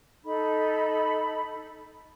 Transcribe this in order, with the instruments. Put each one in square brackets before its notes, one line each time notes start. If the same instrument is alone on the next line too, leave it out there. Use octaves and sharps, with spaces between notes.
[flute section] D#4 A4 B5